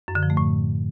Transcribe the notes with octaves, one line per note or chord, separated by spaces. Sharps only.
F#2
D3
F3
A3
A2